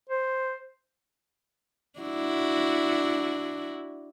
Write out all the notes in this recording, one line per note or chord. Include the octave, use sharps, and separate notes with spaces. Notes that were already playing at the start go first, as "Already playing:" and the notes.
C5
D4 E4 F#4